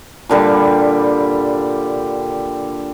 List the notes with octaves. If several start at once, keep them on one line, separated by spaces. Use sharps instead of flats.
A#2 D3 G3